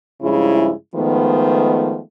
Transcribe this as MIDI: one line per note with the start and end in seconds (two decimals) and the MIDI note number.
0.22 0.71 43
0.22 0.71 49
0.22 0.71 53
0.22 0.71 56
0.22 0.71 64
0.95 2.00 51
0.95 2.00 53
0.95 2.00 56
0.95 2.00 57
0.95 2.00 59